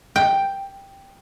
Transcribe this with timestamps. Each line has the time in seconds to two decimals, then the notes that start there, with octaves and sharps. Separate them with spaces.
0.16 G5